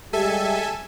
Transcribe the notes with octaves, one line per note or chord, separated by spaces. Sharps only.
G3 G#3 G4 A4 E5 G#5